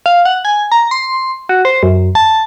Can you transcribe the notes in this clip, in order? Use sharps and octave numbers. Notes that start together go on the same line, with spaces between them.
F5
F#5
G#5
A#5
C6
F#4
C5
F#2
A5